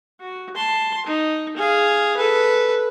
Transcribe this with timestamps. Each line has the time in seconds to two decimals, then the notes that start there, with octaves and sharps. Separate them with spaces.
0.20 F#4
0.56 A5 C6
1.06 D#4
1.57 G#4 F5
2.17 A4 B4